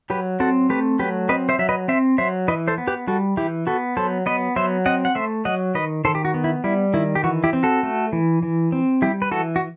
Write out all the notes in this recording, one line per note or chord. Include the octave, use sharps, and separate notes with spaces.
F#3 G4 B4
C4 F#4 A4
A3 G4 B4
F#3 G4 B4
C4 B4 D#5
C5 E5
F#3 E5
B4 D#5
C4 C5 E5
F#3 C5 E5
E3 B4 D#5
A4 C5
B3
G4 B4
G3 F#4 A4
E3 E4 G4
B3 F#4 A4
F#3 A4 C5
B3 B4 D#5
F#3 C5 E5
C4 D#5 F#5
F#5
A3 C5 E5
F#3 D#5 F#5
D#3 B4 D#5
D#3 A4 C5
G4
F#4
B3
E4
G3 E4
D#3 E4
G4
E3 F#4
E4 G4
C4
F#4 A4
A3
E3
E3
C4
G3 E4 G4
B4
E3 F#4 A4
F#4